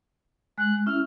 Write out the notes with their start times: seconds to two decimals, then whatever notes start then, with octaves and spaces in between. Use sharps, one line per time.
0.58 G#3 F#6
0.86 C#4 E4 E5 F6